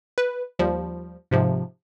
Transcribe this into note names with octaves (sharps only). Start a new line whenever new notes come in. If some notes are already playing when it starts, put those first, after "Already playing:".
B4
D#2 F3 G3
G#2 C3 F3